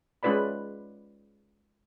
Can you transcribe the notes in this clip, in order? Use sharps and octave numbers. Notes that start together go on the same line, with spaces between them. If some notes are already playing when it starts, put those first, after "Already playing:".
G#3 C#4 F4 B4 D5 B5